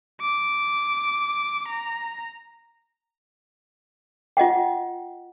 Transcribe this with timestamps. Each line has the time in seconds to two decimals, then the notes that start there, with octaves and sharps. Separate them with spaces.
0.21 D6
1.68 A#5
4.37 F4 D#5 F#5 G5